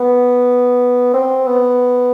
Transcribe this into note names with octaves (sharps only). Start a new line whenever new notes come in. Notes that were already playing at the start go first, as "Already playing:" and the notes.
Already playing: B3
C4
B3